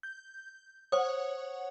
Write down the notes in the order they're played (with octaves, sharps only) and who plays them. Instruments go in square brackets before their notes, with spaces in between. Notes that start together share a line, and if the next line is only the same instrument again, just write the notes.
[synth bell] G6
[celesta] C5 D#6 [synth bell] C#5 F#5